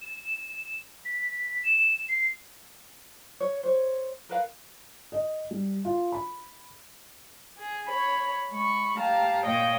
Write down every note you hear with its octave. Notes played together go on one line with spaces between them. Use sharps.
E7
B6
E7
C7
C#5
C5 C#5
A#4 B4 F5 F#5
D#5
G3
F4
B5
G#4
C#5 B5
G#3 B5 C#6
G4 F5 A5 A#5
A#2 C#5 D#5 F5 G5